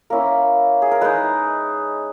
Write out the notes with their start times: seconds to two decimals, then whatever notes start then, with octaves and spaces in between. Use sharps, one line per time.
0.10 A#3 C#4 E4 A#4
0.82 G#4
0.91 A#4
1.01 G#3 D#4 B4